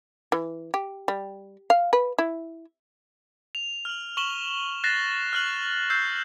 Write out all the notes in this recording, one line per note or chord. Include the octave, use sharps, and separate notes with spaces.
E3
G4
G3
F5
B4
E4
F7
F6 F#7
C#6 E7 F#7 G7
F#6 A6 A#6 C7 E7
F6 F#6 F#7
E6 G6 C7